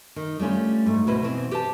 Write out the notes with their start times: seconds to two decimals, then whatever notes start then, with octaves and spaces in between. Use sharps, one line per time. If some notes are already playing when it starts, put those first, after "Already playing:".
0.16 D#3
0.39 G3 A3 C#4 F4
0.86 G#2 A3
1.07 D2 B2 E4 B4 C5
1.22 B2 E3 C4 E4
1.51 G4 B4 C5 F5 A5